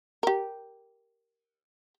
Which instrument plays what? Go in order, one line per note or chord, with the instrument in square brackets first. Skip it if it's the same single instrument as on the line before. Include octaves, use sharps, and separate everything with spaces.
[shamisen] G4 A#4